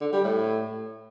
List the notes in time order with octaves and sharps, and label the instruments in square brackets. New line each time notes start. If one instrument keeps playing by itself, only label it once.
[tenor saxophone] D3
G3
A2